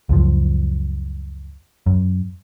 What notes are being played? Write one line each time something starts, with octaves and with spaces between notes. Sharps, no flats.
C#2 F#2 F3
F#2